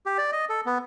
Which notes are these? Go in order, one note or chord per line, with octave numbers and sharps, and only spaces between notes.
G4
D5
D#5
A4
B3